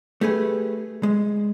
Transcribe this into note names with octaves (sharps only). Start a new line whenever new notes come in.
A3 G4 G#4 B4
G#3